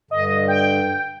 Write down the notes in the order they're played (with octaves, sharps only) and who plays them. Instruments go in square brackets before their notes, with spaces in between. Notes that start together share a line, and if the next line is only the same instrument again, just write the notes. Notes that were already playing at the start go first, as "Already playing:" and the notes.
[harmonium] G2 D3 [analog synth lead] D#5
[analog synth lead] G5